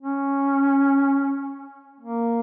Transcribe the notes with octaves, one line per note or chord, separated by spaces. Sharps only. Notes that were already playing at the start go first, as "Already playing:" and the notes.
C#4
A#3